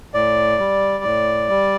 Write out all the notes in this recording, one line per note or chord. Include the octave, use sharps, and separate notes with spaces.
A2 D5
G3
A2
G3